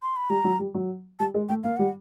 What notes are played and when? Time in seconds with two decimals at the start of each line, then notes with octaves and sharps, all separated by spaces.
0.02 C6
0.16 B5
0.30 G3 A#5
0.44 F#3
0.59 G3
0.74 F#3
1.20 G3 A5
1.34 G#3
1.49 A3 G5
1.64 A#3 F5
1.77 G3 F#5